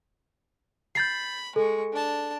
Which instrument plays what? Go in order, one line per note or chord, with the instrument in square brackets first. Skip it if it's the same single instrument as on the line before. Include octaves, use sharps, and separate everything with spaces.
[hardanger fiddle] B5 [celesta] G6 A6 C7
[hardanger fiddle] G#3 C#6 [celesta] A4
[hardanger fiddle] D4 A5